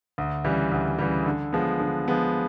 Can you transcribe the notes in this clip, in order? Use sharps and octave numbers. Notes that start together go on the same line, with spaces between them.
D2
C#3 E3 G3
D2
C#3 E3 G3
D3
F3 G#3 B3
D3
F3 G#3 B3